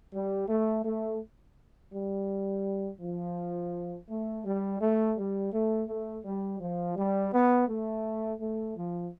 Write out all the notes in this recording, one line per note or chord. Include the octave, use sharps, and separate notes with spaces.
G3
A3
A3
G3
F3
A3
G3
A3
G3
A3
A3
G3
F3
G3
B3
A3
A3
F3